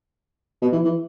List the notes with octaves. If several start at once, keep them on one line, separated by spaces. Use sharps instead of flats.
B2
E3
E3